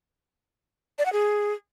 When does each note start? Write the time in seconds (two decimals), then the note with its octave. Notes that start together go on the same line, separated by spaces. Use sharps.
0.99 D5
1.06 F#5
1.13 G#4